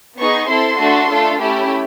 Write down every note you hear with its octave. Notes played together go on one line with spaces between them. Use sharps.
B3 D#4 G#4 C#6
C4 E4 A4 C6
A3 D4 F#4 A4
A3 D4 F4 A4
A3 C#4 E4 G4 B5